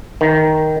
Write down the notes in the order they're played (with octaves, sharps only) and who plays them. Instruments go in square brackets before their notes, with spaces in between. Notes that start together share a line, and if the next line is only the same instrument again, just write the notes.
[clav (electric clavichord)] D#3